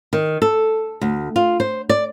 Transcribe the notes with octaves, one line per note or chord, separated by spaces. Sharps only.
D#3
A4
D2
F4
C5
D5